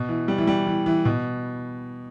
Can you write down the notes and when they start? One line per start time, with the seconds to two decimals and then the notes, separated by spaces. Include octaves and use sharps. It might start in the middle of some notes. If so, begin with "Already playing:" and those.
Already playing: B2
0.09 E3
0.28 G3
0.38 E3
0.47 G3
0.67 E3
0.86 E3
1.05 B2